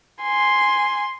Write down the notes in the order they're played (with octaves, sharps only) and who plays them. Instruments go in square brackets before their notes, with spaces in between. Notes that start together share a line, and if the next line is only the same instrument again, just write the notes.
[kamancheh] G#5 C6